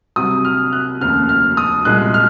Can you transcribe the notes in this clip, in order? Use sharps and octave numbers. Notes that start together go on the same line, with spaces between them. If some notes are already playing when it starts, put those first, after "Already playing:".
C2 C3 F#3 D#6
F6
F#6
F1 D#2 C#3 F6
F6
D#6
C2 A#2 G#3 F#6
F6